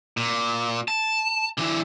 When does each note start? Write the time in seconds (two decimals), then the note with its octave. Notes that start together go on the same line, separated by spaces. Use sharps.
0.17 A#2
0.88 A5
1.58 D3 E3